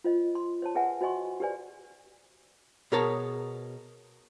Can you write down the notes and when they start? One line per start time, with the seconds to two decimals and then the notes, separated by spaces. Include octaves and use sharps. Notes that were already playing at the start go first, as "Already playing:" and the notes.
0.04 F4 C5 D#5
0.35 C6
0.62 C5 C#5 A5
0.75 G#4 B4 E5 F#5 G#5
1.01 F#4 C5 D#5 G#5 C6 C#6
1.40 G4 G#4 B4 C5 D5 G#5
2.92 B2 G#4 A#4 C#5 A5